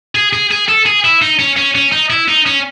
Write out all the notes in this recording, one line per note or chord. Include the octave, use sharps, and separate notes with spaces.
G#4
G#4
G#4
A4
G#4
E4
D#4
C#4
C#4
C#4
D#4
E4
D#4
C#4